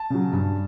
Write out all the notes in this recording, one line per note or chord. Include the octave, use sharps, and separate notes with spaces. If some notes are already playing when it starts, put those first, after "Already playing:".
Already playing: A5
C#3 F#3
G2